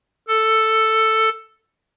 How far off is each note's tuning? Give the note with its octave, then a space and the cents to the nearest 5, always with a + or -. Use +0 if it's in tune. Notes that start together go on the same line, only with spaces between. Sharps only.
A4 +5